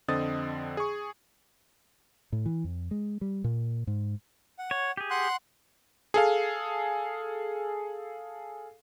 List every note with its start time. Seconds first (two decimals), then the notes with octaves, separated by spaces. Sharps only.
0.08 F2 D3 C4 D#5 D#6 A6
0.77 G#4 C#6
2.32 A2
2.46 E3
2.64 F2
2.91 G#3
3.21 G3
3.44 A#2
3.87 G#2
4.59 F#5
4.71 C#5
4.97 G4 G#4
5.11 F#5 C6 F#6
6.14 G#4 A4 F5